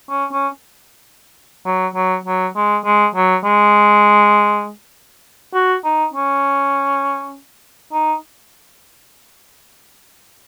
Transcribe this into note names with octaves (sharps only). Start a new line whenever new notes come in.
C#4
C#4
F#3
F#3
F#3
G#3
G#3
F#3
G#3
F#4
D#4
C#4
D#4